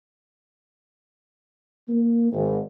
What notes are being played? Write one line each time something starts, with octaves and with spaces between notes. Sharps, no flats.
A#3
G#1